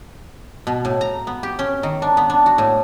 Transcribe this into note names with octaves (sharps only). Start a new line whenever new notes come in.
B2
A2
A#5
B3
G4
C#4
D#3
D4
B3
D4
F#4
A2